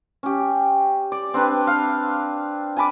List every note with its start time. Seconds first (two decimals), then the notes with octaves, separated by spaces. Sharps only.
0.23 C#4 G4
1.12 D5
1.34 C4 D4 B4
1.67 F5
2.77 G#5 A5 B5 D6